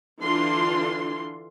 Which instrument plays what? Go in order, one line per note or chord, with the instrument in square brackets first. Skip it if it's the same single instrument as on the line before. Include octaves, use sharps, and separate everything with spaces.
[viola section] D3 E3 D4 F4 C6